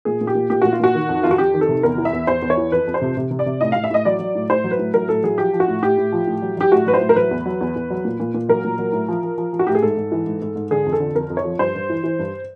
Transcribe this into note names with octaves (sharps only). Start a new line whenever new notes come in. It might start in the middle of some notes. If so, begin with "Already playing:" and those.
A#2 G#4
A#2
G4
A#2
A#2 G4
A#2 F#4
F4
A#2 F#4
D#3
F2
F2 F4
F#4
F2 G4
D#3
A4
C3
E2 A#4
E3
E5
E2
E2 C5
E2
C#5
E3
F2 B4
F2
C5
C3
C3
C3
D5
C3
A2 D#5
A2 F5
E5
A2 D#5
F#3 D5
F#3
A2
A2 C5
F#3
B4
A2
F#3 A#4
A2 A4
F#3 G#4
F3 G4
F3
F#4
A2
A2 G4
A2
F3
A2
F#3
F#3 G4
A2 F#4
F#3 B4
C5
A2
A#4
F#3 B4
E2
F#3
E2
E2
F#3
A#2
A#2
A#2
F#3 A#4
A#2
F#3
A2
F3
F3
F3
F3
F#4
A2 G4
G#4
G#2 A4
G#2
E3
G#2
G#2
G#2
D3 G#4
F2
A4
D3
F2 A#4
F2
C#5
F3
G2 C5
G2
E3
E3
G2